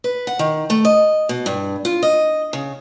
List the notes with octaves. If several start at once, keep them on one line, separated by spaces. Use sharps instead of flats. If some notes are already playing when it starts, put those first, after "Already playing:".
B4
F#5
D#3
A3
D#5
B2
G2
F4
D#5
C#3